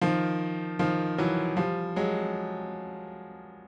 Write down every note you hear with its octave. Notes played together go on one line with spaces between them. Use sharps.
D#3 F3
D#3 F3
E3 F#3
F3 G3
F#3 G#3